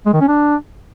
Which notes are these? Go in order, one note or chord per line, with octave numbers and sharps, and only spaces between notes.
G#3
D#3
C#4
D4